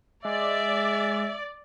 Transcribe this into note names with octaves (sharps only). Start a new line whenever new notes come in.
G#3 D5 E5